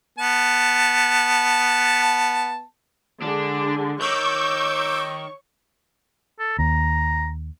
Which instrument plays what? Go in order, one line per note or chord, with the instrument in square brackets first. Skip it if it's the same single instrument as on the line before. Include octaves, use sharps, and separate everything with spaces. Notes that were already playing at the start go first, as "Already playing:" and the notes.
[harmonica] B3 A5
[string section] D3 [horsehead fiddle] G#3 G#4 [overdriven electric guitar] D4
[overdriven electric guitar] D#3 [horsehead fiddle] C#5 [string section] C#6 [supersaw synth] D6 E6 G6
[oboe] A4
[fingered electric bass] D#2 [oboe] A#5